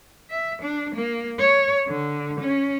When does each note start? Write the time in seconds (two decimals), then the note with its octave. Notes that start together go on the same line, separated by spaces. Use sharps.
0.30 E5
0.62 D4
0.95 A#3
1.39 C#5
1.88 D3
2.40 C#4